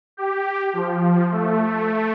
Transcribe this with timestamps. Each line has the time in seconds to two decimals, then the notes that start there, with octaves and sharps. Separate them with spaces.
0.17 G4
0.73 F3
1.31 A3